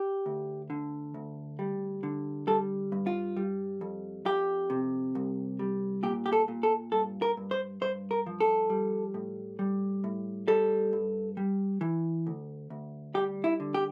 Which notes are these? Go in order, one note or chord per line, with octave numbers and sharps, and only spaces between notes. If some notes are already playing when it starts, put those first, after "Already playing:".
Already playing: G4
D2
D3
D2
G3
D3
G3 A4
G2
F4
G3
F2
F2 G4
C3
C2
G3
A#2 G4
G4
A4
A#2
A4
G2 A4
A#4
G2
C5
G2 C5
A#4
F3
A4
G3
A2
G3
A2
G3 A4
G2
G3
E3
D2
D2
G3 G4
E4
D3
G4